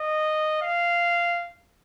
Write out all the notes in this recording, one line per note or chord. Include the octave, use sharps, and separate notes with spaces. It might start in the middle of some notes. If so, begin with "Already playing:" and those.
Already playing: D#5
F5